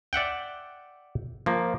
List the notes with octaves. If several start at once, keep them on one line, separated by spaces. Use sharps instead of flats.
D5 E5 F#5 G5
F3 A#3